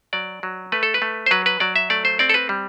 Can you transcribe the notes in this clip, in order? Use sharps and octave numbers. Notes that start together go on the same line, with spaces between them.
F#3 D5
F#3
A3 B4
A4
B4
A3
C5
F#3 B4
B4
F#3 D5
E5
A3 D5
C5
C4 D5
A4
B4
G3